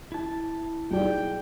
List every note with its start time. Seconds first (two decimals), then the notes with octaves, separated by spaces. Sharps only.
0.12 E4 A5
0.91 B1 G#4 D5 G5